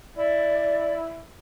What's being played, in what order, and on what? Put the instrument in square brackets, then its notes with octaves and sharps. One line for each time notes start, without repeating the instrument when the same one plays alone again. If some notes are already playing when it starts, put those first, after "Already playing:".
[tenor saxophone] E4 [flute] D5